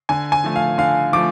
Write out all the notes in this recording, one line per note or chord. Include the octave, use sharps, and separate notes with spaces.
D3 G#5
G#5
F3 A3
F5
D3 F5
F3 A3 D6